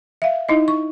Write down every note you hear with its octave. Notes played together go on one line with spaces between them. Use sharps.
E5 F5
D#4 E4 D#5
C#6